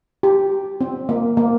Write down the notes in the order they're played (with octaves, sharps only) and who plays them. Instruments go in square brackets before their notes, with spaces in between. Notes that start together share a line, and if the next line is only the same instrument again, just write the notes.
[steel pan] G4
C4
A#3
A#3